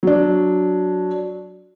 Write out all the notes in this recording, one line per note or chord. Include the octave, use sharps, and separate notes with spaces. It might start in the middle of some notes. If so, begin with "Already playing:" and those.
F#3 D4